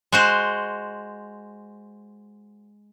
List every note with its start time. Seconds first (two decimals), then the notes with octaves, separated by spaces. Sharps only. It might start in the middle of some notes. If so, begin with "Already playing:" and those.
0.12 G#3 F#4 C5